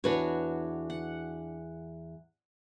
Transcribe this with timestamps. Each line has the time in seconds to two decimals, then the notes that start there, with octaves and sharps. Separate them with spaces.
0.04 E2 D4 F#4 B4 C#5
0.90 F#5